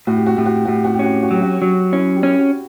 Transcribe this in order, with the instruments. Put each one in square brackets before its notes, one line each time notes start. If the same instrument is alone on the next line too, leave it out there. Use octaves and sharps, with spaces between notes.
[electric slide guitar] A2 [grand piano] F#4
[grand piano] G4
F#4
[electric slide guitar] A2 [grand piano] G4
[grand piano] F#4
G4
[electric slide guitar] A2 [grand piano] F#4
[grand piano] G4
F#4
G4
[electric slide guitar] C#4 [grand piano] F#4
[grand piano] G4
F#4
[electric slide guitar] F#3 [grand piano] G4
[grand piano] F#4
[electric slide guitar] F#3
[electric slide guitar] C#4 [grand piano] E4
[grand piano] G4
[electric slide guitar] C#4
[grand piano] F#4